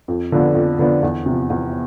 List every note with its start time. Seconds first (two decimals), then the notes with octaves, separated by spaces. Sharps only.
0.08 F2
0.32 D3 F3 B3 D4
0.55 F2
0.79 D3 F3 B3 D4
1.03 E2
1.26 C3 F3
1.50 E2